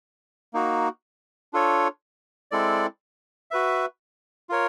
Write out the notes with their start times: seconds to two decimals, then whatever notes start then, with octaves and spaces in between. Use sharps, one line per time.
0.54 A#3 D#4 F#4
1.53 D4 F4 A4 C#5
2.51 G#3 C4 E4 A4 D5
3.51 F#4 B4 E5
4.49 F4 A#4 C#5